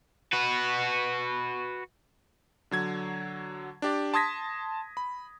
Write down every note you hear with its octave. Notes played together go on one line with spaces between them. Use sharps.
F#4 B4
D3 F#3 G#6
D4 G4 D5
A5 C6 D#6 G#6 A#6 B6
B5